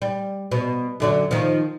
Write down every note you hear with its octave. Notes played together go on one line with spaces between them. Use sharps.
G3
B2
F#2 D3 F#3
D#3 F3